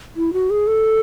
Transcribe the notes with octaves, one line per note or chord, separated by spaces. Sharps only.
E4
F#4
G#4
A4